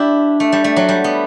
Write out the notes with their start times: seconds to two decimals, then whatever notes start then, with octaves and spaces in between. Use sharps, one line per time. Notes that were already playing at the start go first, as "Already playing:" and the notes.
Already playing: D4 E4 G4
0.40 A3
0.52 G3
0.64 A3
0.76 F#3
0.89 G3
1.04 B3